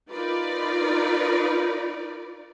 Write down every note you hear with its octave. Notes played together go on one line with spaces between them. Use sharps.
D#4 F4 A#4 B4 D5